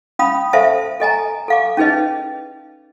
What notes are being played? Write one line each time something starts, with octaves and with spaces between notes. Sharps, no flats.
C#4 F5 B5 D#6
A4 C5 E5 F5 A5
A4 D#5 G#5 A#5
A4 F5 D6
C#4 D#4 G#4 B4 D#5